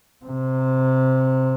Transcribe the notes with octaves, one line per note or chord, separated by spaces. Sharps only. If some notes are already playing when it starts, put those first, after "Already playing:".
C3